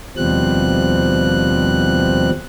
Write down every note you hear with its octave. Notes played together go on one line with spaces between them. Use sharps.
D#2 B2 F3 G3 C4 F#6